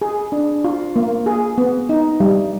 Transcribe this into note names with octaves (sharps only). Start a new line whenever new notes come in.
G#4
D4
F4
A#3
G#4
B3
D#4
G3